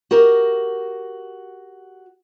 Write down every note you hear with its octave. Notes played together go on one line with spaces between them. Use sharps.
F#4 G4 A#4